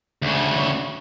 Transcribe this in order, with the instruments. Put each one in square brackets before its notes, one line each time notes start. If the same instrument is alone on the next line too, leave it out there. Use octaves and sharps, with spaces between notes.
[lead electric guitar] D2 C#3